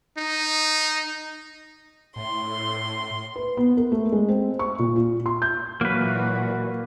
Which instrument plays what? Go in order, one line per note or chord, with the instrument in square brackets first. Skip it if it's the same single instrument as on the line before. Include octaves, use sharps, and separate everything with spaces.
[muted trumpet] D#4
[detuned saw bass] A2 [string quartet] C6
[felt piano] B4
B3
A#4
A3
G#3
C4
C#6
A#2
F4
C6
G6
[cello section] A#2 E3 F#4 [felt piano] F#3 [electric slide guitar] A#3 B4